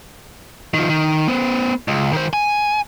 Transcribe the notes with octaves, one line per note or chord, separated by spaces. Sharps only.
D#3 F3
D#3
B3 C5
C#2
D#3 C5
G#5